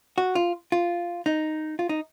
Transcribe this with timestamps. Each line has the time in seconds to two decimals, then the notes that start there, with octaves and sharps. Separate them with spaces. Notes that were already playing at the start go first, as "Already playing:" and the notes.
0.18 F#4
0.35 F4
0.72 F4
1.26 D#4
1.79 F4
1.89 D#4